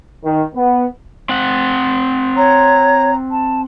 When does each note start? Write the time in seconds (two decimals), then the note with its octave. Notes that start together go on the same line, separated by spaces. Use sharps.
0.24 D#3
0.55 B3
1.29 C4 F#5
2.37 C#5 A#5
3.31 A5